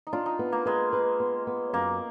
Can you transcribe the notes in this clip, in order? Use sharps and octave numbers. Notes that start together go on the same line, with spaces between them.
D#4
D4 F4
D#4
B3
A#3
G#3 B4
B4
B3
B3
F#2 A#3